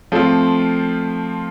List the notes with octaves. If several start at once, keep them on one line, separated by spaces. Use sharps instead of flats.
F3 A3 C4 F4